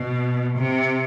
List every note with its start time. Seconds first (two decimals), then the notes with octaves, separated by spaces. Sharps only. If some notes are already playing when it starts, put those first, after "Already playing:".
Already playing: B2
0.58 C3